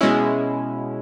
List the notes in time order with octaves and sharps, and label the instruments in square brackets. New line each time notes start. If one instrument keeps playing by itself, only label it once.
[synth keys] B2 G#3 C#4 E4